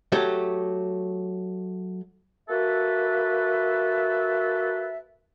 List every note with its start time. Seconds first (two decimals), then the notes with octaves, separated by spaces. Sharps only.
0.12 F#3 A3 G4
2.49 A#3 F#4 A4 B4 E5